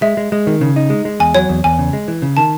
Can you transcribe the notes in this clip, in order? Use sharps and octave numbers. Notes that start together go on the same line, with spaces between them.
G#3 E5
G#3
G#3
D#3
C#3
D#4
G#3
G#3
E2 G#5
F#3 C#5
E2
E2 G#5
C#3
G#3
E3
C#3
D#3 A5